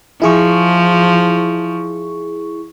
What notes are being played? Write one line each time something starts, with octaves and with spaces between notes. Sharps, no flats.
F3 E4 G#4 C#6